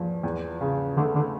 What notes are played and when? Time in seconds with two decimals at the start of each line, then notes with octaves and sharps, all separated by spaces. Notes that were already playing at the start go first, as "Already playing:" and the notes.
Already playing: E2 F3
0.23 E2
0.61 C#3
0.97 D3 A3
1.15 D3